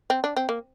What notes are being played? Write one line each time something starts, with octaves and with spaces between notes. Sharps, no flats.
C4
D4
C4
A#3